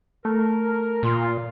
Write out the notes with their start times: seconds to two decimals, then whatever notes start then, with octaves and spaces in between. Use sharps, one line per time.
0.25 A3 A#4
1.03 A#2 F4